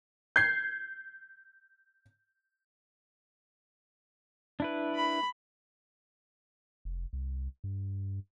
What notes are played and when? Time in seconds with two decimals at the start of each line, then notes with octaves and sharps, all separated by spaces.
0.36 G6 G#6 C7
4.60 D4 E4 B4
4.96 B5
6.85 F1
7.13 C2
7.64 G2